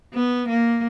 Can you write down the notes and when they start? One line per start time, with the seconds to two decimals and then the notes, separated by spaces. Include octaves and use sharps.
0.13 B3
0.49 A#3